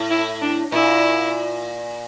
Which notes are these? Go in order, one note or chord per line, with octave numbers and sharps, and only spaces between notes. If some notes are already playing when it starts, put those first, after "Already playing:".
Already playing: A2
E4
D4
A#2 E4